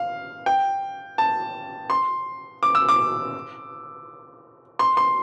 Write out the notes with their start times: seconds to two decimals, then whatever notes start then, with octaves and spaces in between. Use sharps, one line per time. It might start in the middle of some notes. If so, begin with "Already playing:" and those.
Already playing: F5
0.46 G5
1.18 A5
1.90 C6
2.63 D6
2.75 E6
2.89 D6
4.79 C6
4.97 C6